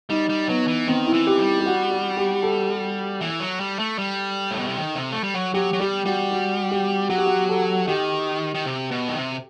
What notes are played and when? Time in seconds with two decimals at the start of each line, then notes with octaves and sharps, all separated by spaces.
0.10 G3 D#4
0.29 G3
0.49 F#3 B3
0.68 E3
0.87 D#3 C4
1.06 E4
1.13 E3
1.27 G4
1.39 G3
1.60 G4
1.66 F#4
1.91 F#4
2.17 G4
2.43 A4
3.21 E3
3.40 F#3
3.60 G3
3.79 A3
3.99 G3
4.51 A2
4.59 B2
4.68 C3
4.77 D#3
4.95 C3
5.12 A3
5.24 G3
5.34 F#3
5.54 F#3 G4
5.73 F#3
5.80 G3 G4
6.05 G3 F#4
6.31 F#4
6.71 G4
7.09 F#3 F#4
7.18 G4
7.26 F#4
7.49 A4
7.87 D#3 G4
8.55 D#3
8.65 C3
8.91 B2
9.08 D#3
9.17 C3